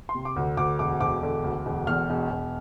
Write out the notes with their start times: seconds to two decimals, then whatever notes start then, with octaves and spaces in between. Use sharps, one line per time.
0.09 C6
0.15 C3
0.25 D6
0.36 D2
0.57 D2 D6
0.79 E1 D6
1.01 E1 D6
1.23 D3
1.44 D2
1.66 E1
1.87 E2 F6
2.10 E1
2.31 E1